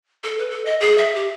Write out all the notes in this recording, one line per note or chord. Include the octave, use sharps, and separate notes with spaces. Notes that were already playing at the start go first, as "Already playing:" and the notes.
A4
B4
A4
D#5
G#4
E5
G4